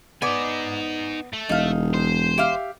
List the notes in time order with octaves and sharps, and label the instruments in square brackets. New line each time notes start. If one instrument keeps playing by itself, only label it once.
[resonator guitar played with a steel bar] B3 D5 [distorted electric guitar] D#4 G#5
[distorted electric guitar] A3
[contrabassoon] E1 [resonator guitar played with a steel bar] D#4 F5
[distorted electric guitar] C5
[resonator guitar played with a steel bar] G4 E5 F5